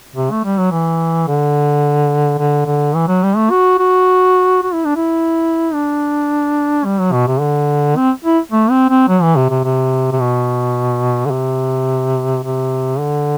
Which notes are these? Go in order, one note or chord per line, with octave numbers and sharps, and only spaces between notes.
C3
A3
G3
F#3
E3
D3
D3
D3
E3
F#3
G3
A3
F#4
F#4
F#4
E4
D4
E4
D4
G3
F#3
B2
C3
D3
C4
E4
A3
C4
C4
F#3
E3
C3
C3
C3
C3
B2
D3
C3
C3
D3